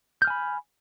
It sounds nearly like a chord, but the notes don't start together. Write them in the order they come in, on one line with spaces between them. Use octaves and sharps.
G6 F6 G#5 B5